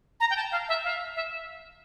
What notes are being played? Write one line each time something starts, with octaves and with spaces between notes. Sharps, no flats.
A#5
G5
A5
F5
E5
F5
E5